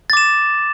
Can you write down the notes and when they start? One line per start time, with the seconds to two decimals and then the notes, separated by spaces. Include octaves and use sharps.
0.10 A6
0.13 D6
0.17 E7